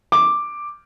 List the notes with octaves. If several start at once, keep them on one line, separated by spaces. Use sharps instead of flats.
D6